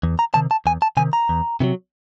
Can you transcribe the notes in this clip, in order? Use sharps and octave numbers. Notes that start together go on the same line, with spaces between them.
E2
A#5
C3 D#3 A5
A5
E2 G#5
A5
C3 D#3 G#5
A#5
E2
C3 D#3 F#3